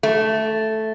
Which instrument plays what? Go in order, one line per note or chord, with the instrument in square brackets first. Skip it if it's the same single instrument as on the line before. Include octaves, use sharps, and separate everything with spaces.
[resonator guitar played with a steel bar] A3